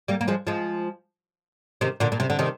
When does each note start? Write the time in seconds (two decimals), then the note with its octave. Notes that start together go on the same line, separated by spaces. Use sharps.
0.08 G3 A#3
0.21 A#3
0.28 F3 G#3
0.47 F3 G#3
1.81 C3 D#3
2.00 A#2 D3
2.12 A#2
2.20 C3
2.30 D3
2.39 C3 D#3